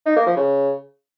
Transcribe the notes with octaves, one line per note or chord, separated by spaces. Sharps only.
D#4
A#3
F3
C#3